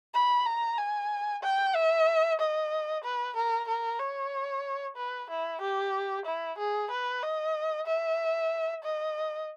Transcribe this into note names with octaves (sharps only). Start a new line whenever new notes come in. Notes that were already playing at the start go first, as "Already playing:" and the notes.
B5
A#5
G#5
G5
E5
D#5
B4
A#4
A#4
C#5
B4
E4
G4
E4
G#4
B4
D#5
E5
D#5